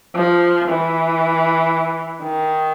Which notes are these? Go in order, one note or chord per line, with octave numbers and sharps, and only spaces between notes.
F3
E3
D#3